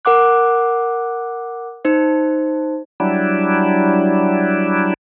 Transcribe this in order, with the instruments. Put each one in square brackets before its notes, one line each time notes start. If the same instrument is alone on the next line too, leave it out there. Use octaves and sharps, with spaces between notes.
[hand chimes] A#4 F#5 D6 F#6
D#4 C5
[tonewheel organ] F#3 G3 D4 E4